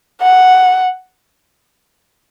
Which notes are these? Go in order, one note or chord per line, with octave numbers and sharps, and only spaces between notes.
F#5